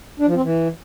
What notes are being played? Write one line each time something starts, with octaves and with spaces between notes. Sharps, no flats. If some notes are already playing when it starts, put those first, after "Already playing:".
D4
F3
C4
E3